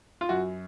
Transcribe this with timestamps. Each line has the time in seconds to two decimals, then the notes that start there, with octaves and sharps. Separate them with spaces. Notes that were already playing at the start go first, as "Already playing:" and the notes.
0.21 F4
0.29 F#2 F#4